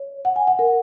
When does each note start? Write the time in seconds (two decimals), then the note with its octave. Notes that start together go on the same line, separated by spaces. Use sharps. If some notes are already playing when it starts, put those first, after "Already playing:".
Already playing: C#5
0.25 F#5
0.36 G#5
0.47 F#5
0.59 A#4